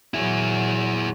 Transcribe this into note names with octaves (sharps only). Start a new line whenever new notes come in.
A#2 F#3 E4 G#4